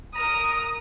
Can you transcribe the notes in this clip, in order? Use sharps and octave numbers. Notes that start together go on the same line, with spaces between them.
A#4 A#5 D#6